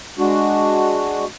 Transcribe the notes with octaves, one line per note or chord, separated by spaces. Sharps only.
G#3 D4 F#4